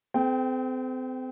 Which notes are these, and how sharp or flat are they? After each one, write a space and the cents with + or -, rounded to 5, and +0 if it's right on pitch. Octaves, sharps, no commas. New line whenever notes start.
C4 -35 A4 -45 G5 +0